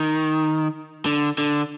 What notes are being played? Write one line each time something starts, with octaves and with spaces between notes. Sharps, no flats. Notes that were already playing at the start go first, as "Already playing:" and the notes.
Already playing: D#3
D3
D3